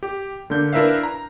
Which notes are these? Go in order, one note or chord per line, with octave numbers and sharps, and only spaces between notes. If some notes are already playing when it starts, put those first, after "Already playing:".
G4
D3 A#3 D4 G6
D4 E4 A#4 B4 E5 F5
A#5